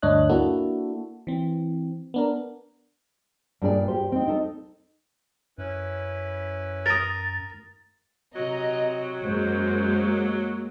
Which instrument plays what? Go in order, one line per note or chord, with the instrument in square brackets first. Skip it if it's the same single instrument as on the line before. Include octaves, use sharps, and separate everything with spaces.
[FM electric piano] D2 G2 D4 C#5 D#5 F#6
A#3 D4 E4 F#4 A4
E3 C4
B3 D4 A#4
[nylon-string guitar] G2 A#2 D4 G#4 A4 D5
G4 C5
C4 D#4
D#4 A4
[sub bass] F#2 [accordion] C#4 E4 B4
[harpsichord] A#4 D#6 [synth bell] A6
[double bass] C3 [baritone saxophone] F#3 [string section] D#5 A#5
[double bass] F#2 C#4 [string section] G#3 A#3 [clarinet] C5